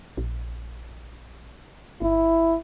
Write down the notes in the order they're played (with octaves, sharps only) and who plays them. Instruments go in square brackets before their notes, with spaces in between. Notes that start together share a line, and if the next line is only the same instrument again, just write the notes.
[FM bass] A#1
[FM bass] G1 [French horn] E4